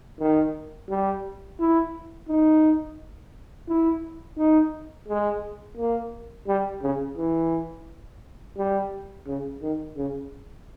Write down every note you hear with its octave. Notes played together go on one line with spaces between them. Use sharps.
D#3
G3
E4
D#4
E4
D#4
G#3
A#3
G3
C#3
E3
G3
C#3
D#3
C#3